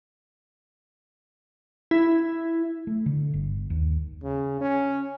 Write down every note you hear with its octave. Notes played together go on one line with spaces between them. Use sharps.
E4
A3
D3
G1
D#2
C#3
C#4